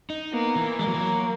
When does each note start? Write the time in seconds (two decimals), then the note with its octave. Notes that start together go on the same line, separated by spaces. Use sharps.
0.10 D#4
0.33 A#3 B3
0.56 E3
0.79 G#3 A#3
0.87 F#3
0.94 E3
1.01 F#3